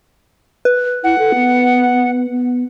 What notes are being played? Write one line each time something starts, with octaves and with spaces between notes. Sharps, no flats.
B4
E4 F#5
A4
B3
B3